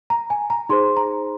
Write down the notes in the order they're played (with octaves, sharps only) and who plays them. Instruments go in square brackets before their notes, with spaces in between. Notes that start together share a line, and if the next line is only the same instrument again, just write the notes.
[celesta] A#5
G#5
A#5
D#4 G#4 C5 C6
A#5